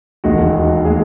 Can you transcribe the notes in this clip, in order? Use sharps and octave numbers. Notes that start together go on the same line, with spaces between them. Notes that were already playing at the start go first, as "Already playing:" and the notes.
E1 D#2 D#3 G#3 F#4
F#4
G#3 G#4